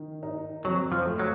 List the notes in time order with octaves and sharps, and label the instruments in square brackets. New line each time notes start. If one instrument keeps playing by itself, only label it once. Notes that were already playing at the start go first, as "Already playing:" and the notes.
Already playing: [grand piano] D#3
D#4
[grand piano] F2 [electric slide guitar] F#3
[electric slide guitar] F3
[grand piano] A3
[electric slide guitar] F#3